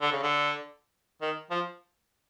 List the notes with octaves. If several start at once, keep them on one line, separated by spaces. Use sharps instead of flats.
D3
C#3
D3
D#3
F3